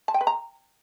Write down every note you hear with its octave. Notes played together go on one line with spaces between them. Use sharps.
A5
G5
B4
A#5